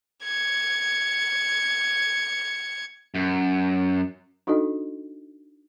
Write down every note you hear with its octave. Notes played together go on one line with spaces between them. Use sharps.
G#6 C#7
F#2
D4 D#4 F#4 A4 D#5